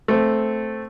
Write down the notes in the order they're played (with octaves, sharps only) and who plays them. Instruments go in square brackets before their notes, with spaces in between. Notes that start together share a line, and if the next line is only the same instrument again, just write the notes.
[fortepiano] A3 C4